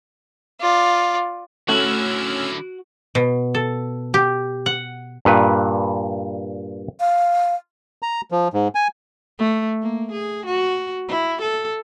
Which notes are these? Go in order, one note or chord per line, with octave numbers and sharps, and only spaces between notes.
F4 D5
D3 A3 C#4 E4 F#4 E6 F6
B2
A4
G4
F#5
G2 A#2 B4
F5
A#5
F3
G#2
G#5
A3
A#3
G#4
F#4
E4
A4